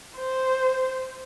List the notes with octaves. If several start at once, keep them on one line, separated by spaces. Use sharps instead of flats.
C5